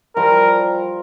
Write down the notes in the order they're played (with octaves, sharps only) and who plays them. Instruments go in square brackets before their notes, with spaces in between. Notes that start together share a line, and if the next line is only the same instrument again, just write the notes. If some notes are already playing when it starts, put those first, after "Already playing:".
[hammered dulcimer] F3 G3 [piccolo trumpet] A#4